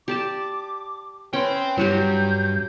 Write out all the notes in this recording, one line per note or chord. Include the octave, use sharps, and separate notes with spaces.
G4 D5 A5 D6
C#4 B4 G5 C6
G2 F#3 F#4 G4 G6